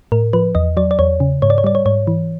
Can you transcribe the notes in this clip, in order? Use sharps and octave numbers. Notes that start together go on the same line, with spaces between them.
A2 A#4
F3 B4
E2 D#5
F#3 D5
D5
E2 C#5
C#3
G#2 C#5
D5
C#5
G3 D5
C#5
G#2 C#5
E3